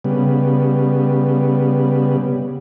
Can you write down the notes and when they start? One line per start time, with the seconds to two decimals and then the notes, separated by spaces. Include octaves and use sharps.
0.05 C#3 G3 B3